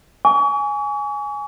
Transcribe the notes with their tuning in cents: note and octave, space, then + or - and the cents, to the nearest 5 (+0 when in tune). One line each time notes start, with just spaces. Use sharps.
G#5 +0 C#6 +40